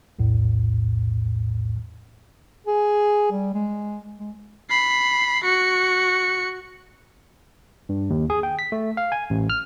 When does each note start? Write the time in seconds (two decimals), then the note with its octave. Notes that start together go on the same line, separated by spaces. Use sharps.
0.19 B1 E2 A2
2.67 G#4
3.32 G3
3.54 G#3
4.18 G#3
4.70 B5 C7
5.44 F#4 C#7
7.89 G2
8.10 D#2
8.30 G#4
8.43 G5
8.59 B6
8.72 A3
8.97 F5
9.12 G#5
9.30 A1
9.50 F6